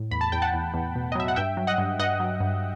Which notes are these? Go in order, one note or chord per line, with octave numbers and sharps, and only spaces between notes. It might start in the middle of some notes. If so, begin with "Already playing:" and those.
Already playing: A2
E2 B5
A5
E2 G5
F#5 A5
E2
E2
B2
D#5
F#3 E5
F#5
G2 E5 G5
F#3
D#5 F#5
G2
G2 D#5 F#5
F#3
G2